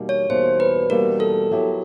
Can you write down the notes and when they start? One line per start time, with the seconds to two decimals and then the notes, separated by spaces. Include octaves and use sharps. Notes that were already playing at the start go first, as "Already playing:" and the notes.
Already playing: E2 B2 G3 A#3 D#4
0.09 C#5
0.30 E2 B2 G3 A#3 D#4 C5
0.60 B4
0.90 E2 B2 G3 A#3 D#4 A#4
1.20 A4
1.51 F#3 B3 E4 G4